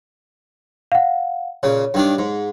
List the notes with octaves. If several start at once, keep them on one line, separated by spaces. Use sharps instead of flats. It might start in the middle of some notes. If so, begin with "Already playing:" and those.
F5 F#5
A#2 C#3 C#5
G2 D#3 D4
G#2